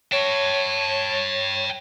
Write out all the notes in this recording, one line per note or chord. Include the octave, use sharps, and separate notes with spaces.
C#5 G5 A5